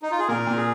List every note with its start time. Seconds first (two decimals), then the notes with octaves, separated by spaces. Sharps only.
0.03 D#4
0.11 F4
0.19 G#4
0.28 A#2 A#4
0.47 A#2
0.57 G#4